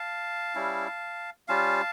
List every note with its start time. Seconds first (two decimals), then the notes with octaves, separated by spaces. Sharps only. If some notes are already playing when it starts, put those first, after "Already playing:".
Already playing: F5 A5
0.55 G3 C#4 E4
1.48 G3 C#4 F4 F5 A5